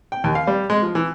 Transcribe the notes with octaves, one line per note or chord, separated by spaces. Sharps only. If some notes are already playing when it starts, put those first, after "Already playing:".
G5
D#2
F5
G3
G#3
F3
E3